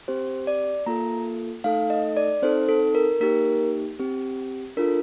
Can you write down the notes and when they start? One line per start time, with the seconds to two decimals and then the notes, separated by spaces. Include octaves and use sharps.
0.08 C4 G4 C5
0.47 D5
0.86 A#3 F4 A4 A#5
1.64 A3 D#4 A4 F5
1.90 D#5
2.17 D5
2.42 C4 D#4 A4 C5
2.69 A4
2.95 A#4
3.20 A#3 D#4 G4 A#4
4.00 C4 G4
4.77 D4 F4 A4 A#4